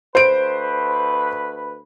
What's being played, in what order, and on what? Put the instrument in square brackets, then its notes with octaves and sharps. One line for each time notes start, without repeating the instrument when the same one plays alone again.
[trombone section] D2 B4 [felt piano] C5 D7